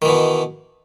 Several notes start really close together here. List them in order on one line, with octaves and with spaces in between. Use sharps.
D#3 E3 B2